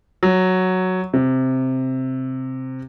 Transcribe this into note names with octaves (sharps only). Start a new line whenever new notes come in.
F#3
C3